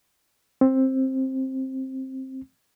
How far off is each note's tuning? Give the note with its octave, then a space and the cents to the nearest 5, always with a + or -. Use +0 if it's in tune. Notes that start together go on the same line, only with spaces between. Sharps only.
C4 +15